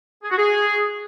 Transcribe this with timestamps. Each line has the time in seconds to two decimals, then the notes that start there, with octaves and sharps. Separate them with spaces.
0.23 G#4
0.30 F#4
0.38 G#4